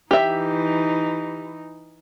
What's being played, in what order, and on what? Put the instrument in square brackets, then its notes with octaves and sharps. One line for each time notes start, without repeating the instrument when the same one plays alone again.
[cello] E3 D#4 [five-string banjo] G4 E5